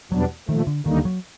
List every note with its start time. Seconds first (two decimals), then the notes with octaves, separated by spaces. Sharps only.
0.11 E2 B2 F#3 G3 B3 D4
0.48 A#2 D#3 F3 A3
0.67 D3
0.86 D#2 D3 D#3 G3 A#3 D#4
1.05 F#3